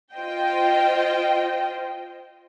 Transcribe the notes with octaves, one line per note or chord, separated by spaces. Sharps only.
F4 C5 D#5 G5